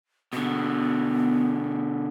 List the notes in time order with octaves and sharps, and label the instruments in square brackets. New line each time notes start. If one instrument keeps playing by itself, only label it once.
[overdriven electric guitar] B2 D3 [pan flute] B3